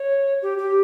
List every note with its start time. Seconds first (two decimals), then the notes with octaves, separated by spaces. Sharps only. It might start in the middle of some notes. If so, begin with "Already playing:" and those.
Already playing: C#5
0.42 G4
0.58 G4